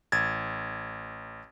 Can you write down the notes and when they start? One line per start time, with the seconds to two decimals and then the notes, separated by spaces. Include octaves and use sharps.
0.12 A1 G#6 A6